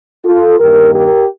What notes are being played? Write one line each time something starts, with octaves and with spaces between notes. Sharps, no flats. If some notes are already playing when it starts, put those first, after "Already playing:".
F4 A4
G2 D#3 A#3 G4 A#4
G4 A#4